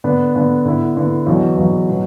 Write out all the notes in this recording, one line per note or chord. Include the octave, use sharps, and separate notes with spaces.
D3 B3 D4
D3 B3 D4
D3 B3 E4
D3 B3 E4
E2 B2 F#3
E2 B2 F#3
B2 F#3